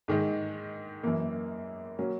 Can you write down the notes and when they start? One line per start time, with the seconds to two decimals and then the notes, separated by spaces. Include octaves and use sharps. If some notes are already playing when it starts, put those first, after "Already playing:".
0.08 G#2 D#3 G#3
1.03 F#2 E3 A#3
1.99 F#3 A#3 C#4